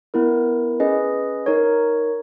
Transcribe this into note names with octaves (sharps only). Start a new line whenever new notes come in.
B3 E4 A#4
C#4 G#4 B4 D#5
D#4 A#4 C#5